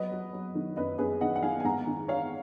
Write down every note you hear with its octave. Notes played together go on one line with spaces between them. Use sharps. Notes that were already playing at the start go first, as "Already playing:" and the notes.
Already playing: F#3 B4 D#5
F#3
F#3
D#3
F#2 B4 D#5
F#2 G#4 B4
D#3 D#5 F#5
F#5
D#3 F5 G#5
G#5
G#2 F#5 A#5
D#3
D#4 C#5 F5